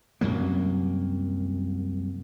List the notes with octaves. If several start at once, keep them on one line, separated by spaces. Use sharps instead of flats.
C2 F#2 F#3 A#3